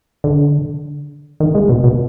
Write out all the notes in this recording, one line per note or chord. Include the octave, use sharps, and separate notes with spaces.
D3
D#3
G#3
B2
B2